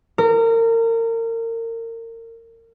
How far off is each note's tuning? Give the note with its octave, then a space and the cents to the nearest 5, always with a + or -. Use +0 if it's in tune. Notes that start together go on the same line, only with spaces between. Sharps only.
A#4 -30